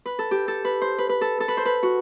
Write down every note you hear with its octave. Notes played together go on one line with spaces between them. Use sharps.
B4
A4
G4
A4
B4
C5
B4
B4
A4
A4
B4
C5
B4
F#4